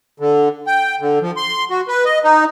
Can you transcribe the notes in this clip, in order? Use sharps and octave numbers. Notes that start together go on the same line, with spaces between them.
D3
G5
D3
F3
C6
F#4
B4
D#5
D#4